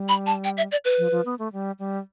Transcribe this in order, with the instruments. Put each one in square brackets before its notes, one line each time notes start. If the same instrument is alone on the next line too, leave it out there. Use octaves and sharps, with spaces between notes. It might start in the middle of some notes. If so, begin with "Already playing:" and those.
Already playing: [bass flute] G3
[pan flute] B5
A5
G5
E5
D5
B4
[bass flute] F3
F3
B3
A3
G3
G3